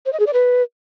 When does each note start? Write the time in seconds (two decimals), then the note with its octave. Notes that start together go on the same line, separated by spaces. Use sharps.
0.06 C5
0.13 D#5
0.20 G#4
0.26 D5
0.33 B4